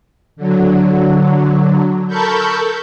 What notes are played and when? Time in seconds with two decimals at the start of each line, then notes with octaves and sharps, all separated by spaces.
0.36 D3 F#3
2.07 A4 A#4 A5 B5 C#6 G6